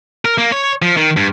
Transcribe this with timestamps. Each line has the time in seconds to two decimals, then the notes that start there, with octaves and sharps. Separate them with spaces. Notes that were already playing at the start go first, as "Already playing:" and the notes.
0.25 A#4
0.38 A#3
0.52 C#5
0.82 F3
0.97 D#3
1.17 G2